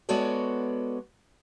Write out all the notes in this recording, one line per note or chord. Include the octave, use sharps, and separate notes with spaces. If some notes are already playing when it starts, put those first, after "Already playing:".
G#3 B3 F#4 A4 C#5 D5